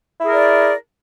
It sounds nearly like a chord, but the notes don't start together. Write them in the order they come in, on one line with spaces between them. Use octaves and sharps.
E4 G#4 A#4 D5